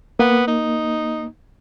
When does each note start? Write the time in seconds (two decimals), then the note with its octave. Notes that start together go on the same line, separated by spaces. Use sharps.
0.19 A#3 B3
0.47 D#4